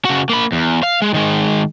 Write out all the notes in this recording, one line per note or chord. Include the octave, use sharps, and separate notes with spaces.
C#3 F#4
A#3 B5
E2
F5
G#3
D#3 G#3